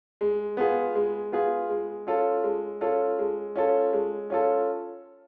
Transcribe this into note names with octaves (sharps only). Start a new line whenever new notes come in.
G#3
B3 F4 G#4
G#3
B3 F4 G#4
G#3
C#4 F4 A4
G#3
C#4 F4 A4
G#3
C#4 F4 A4
G#3
C#4 F4 A4